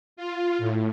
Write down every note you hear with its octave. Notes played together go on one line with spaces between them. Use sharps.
F4
A2